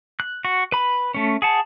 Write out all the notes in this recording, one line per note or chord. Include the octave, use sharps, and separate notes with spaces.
F#6
F#4
B4 B5
A3 C#4
G#4 F#5 A5